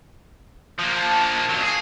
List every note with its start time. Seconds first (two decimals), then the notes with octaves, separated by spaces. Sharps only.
0.79 F3 A#3
0.96 A5
1.49 F2 F#3
1.63 G#4 C7